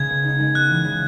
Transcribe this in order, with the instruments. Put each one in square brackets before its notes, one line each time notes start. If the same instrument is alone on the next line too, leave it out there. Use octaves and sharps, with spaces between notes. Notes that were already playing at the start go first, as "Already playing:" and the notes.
Already playing: [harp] C#3 G#3 [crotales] G#6
[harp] B3
D#4
G#3
[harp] B3 [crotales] F#6
[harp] E3
C#3